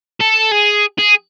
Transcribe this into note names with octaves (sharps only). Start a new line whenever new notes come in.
A4
G#4
G#4